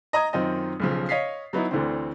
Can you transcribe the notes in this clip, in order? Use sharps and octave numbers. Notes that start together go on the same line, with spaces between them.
D#5 A#5 D#6 G#6
F#2 D#3 C4 F4 D#5
B1 C#3 F3
C#5 D#5 F5 B6 C7
F#3 B3 D#4 E4
D2 D3 E3 C4